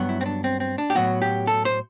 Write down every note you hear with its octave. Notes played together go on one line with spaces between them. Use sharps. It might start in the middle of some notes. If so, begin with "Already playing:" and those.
Already playing: G2 F#3 B3
E4
C4
D4
C4
C4
D4
G4
A2 F#3 B3 F#4
G4
A4
C5